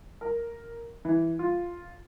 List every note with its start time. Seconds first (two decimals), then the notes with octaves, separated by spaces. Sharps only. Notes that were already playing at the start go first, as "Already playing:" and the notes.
0.21 A#4
1.05 E3
1.39 F4